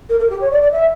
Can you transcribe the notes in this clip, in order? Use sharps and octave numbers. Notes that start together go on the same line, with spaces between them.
A#4
A#4
G4
C#5
D5
D5
E5